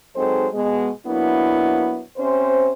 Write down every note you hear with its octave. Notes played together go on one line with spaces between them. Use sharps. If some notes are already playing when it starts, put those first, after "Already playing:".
F#3 G#3 C4 D#4 A4 C5
B2 G#3 B3
F#3 A#3 B3 D4 E4
C3 C4 C#4 C5